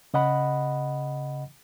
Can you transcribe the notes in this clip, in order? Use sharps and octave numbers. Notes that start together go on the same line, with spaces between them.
C#3 D#5 F#5 B5